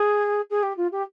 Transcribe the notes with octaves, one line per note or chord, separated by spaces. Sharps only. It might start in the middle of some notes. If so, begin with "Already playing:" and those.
Already playing: G#4
G#4
G4
F4
G4